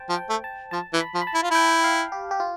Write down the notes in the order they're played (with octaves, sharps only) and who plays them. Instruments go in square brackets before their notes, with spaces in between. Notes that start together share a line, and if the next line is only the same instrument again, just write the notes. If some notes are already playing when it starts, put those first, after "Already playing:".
Already playing: [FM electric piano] C5 G5 A5
[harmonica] F3
[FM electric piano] G5
[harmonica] A3
[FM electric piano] A5
[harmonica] F3 [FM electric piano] A5
[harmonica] E3
[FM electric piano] B5
[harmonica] F3
[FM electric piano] B5
A5
[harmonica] E4
F4
[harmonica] E4 [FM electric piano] G5
[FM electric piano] F5
G4
G4
F4